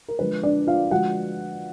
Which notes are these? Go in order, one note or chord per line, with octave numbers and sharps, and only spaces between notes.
A#4
D3 F3 G#3 B4
D4 D5
F4 F5
D3 F3 G#3 F#4 F#5